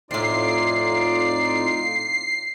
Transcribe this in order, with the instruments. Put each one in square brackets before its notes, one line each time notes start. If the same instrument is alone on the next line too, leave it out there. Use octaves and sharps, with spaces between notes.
[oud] F2 A2 [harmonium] D#4 F4 [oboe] D5 [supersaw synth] C7